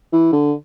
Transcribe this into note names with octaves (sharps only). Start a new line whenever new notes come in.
E3
D3